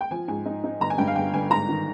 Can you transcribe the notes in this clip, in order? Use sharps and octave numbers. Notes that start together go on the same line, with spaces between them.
G5
F3 G#5
G#2 G#5
D#4
D#4
G1 A#5
G#5
G2 G5
F5
G1 G5
G1 G#5
G#2 A#5
D#3